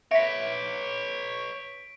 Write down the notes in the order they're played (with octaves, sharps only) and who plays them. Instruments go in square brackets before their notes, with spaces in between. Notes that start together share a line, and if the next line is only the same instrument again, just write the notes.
[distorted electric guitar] B4 C#5 [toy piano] E5 [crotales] B6 D7